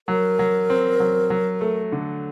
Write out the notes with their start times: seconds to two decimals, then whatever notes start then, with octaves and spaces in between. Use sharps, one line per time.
0.08 F#3 A#4
0.39 F#3
0.70 C4
1.00 F#3
1.30 F#3
1.61 A3
1.92 D3